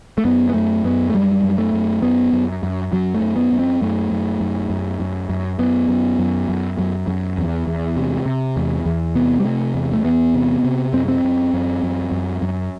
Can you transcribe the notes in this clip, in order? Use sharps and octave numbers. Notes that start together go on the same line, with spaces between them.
A3
F#2 B3
B3
F#2 A3
F#2 B3
A3
F#2 G3
F#2
A3
F#2
F#2 B3
F#2
F#2
F#2 F#3
A3
F#2
B3
F#2
C4
F#2 A3
F#2
F#2
F#2
F#2
F#2
F#2 B3
F#2
F#2
F#2
F#2
F#2
E2
E2
C3
C3
E2
E2
C3 B3
G3
C3 A3
E2
A3
E2 B3
C3
C3
F#2 C4
C4
F#2
F#2
F#2
F#2
F#2